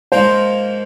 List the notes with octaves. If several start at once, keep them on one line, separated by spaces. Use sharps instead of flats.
G#2 F3 A#3 C5